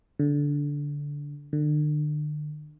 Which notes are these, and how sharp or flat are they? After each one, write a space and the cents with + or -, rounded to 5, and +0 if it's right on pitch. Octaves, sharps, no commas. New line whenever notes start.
D3 -15
D3 +35